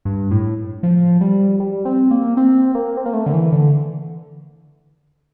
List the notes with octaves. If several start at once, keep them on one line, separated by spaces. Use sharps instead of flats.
G2
A2
F3
G3
G3
C4
A#3
C4
A#3
C4
A#3
A3
D3
E3
D3